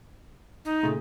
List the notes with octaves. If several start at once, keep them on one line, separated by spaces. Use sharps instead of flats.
D#4
A#2 C#3 A3